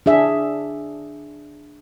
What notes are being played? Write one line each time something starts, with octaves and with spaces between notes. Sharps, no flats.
D4 G#4 E5